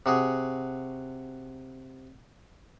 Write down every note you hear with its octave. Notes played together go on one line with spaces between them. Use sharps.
C3 F#4 G#4